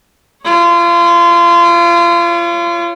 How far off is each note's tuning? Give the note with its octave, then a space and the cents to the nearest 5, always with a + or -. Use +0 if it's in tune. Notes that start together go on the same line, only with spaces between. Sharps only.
F4 -30 C#5 +0